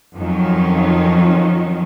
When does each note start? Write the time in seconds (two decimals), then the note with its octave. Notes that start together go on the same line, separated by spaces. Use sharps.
0.16 F2 D#3 F3 F#3 C#4